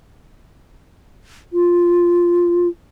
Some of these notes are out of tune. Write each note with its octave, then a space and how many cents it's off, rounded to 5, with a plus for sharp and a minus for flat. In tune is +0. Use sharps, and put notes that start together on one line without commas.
F4 +0